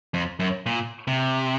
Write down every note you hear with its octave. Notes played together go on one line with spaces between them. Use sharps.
F2
F#2
A#2
C3